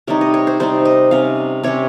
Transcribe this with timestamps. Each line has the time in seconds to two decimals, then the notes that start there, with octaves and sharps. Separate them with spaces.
0.07 C3 G3 C4 D#4 C#5
0.21 D#5
0.34 C#5
0.47 C5
0.60 C3 G3 C4 D#4 C5
0.85 D#5
1.11 C3 G3 C#4 F5
1.63 C3 G3 C#4 C#5